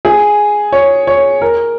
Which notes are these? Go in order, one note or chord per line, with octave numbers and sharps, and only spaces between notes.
G#4
C#5
C#5
A#4